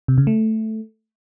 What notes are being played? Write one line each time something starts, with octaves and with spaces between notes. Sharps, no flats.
C3
C#3
A3